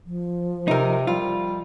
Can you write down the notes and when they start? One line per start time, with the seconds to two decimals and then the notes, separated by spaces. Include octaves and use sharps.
0.06 F3
0.68 C3 D#4 A#4
1.07 G3 F4